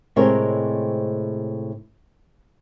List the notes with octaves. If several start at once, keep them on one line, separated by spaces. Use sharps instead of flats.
A2 C3 G#3 C4 A#4 C#5